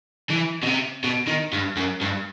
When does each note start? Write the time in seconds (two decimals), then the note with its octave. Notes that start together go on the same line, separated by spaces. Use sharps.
0.30 E3
0.63 B2
0.67 C3
1.04 B2
1.27 D#3
1.53 G2
1.77 F#2
2.01 G2